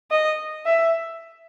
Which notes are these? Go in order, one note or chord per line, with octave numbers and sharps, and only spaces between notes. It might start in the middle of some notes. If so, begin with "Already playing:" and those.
D#5
E5